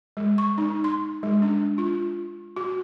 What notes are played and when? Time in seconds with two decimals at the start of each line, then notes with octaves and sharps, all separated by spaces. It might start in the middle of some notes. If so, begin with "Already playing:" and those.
0.17 G#3
0.38 C#6
0.58 D#4
0.84 C6
1.23 G#3
1.42 D4
1.78 F4
2.56 F#4